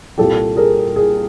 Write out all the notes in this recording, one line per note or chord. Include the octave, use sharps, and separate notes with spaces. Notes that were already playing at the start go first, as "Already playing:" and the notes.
C2 A#2 G3 A#3 G4 A4
G#4 A#4
G#4